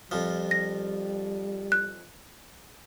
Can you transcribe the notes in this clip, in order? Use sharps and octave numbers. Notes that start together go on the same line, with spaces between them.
F2 F3 G3
A#6
F#6